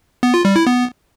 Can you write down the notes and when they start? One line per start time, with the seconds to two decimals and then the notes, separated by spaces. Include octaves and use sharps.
0.23 B3
0.34 F4
0.45 G3
0.56 E4
0.67 B3